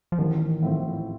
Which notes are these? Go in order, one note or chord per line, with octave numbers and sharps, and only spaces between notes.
F3
A1 D#3
A2 F3 C4